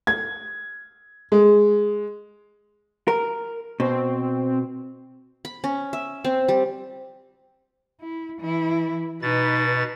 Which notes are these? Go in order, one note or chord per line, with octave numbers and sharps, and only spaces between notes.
G#6
G#3
A#4
B2 C4
B5
C#4
E5
C4
G3
E4
E3 E4
B2 D#4 B4 A6